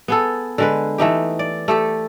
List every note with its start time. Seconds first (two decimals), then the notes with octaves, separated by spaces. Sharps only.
0.08 B3 G#4 A4
0.58 D3 G#3 B4
0.98 E3 A3 D#4 G4
1.39 D5
1.68 A3 G4 A4